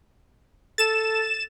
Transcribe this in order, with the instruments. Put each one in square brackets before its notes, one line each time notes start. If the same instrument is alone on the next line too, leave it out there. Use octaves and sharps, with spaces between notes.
[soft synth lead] A4 [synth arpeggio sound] A6 E7